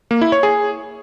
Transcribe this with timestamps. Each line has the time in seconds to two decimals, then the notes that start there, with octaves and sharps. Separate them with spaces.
0.11 A#3
0.21 E4
0.32 C#5
0.43 G#4